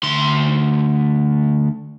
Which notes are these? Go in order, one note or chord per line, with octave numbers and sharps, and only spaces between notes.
D2 C6